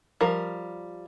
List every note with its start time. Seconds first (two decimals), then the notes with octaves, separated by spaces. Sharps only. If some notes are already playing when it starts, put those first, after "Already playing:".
0.21 F3 G3 A#4